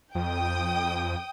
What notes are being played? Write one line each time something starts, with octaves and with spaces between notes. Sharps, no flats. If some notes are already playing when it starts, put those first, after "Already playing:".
F2 G5 D#6